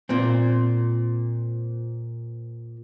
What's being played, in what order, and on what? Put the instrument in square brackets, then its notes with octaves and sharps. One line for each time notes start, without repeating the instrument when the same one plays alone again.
[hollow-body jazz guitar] A#2 C4